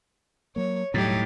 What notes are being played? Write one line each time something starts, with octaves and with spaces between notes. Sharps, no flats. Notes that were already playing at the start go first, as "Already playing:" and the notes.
F#3 A#3 C#5
E1 A2 F#3 G3 D#4 G4